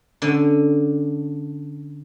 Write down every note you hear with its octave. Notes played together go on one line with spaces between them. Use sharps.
D3 C#4